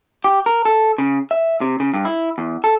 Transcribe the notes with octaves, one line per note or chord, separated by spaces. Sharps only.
G4
A#4
A4
C#3
E5
C3
C#3
G2
E4
E2
A4